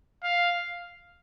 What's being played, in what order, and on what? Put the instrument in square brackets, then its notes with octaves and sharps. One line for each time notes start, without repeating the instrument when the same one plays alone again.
[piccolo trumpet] F5